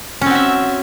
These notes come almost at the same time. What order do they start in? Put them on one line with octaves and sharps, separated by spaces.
C#4 C4 F#4 E5